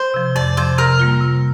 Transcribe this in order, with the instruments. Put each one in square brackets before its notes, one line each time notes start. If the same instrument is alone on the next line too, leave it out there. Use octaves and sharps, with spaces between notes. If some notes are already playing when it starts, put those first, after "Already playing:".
Already playing: [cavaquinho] C5
[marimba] C3 F3
[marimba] F2 [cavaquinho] D5
[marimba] C3 F3 [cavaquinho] C5
[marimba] C3 [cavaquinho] A#4
[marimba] G3 A#3 F4
C3